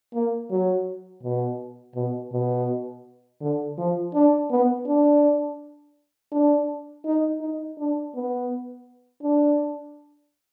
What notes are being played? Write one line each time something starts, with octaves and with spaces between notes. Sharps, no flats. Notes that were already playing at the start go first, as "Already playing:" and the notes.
A#3
F#3
B2
B2
B2
D3
F3
D4
B3
D4
D4
D#4
D#4
D4
B3
D4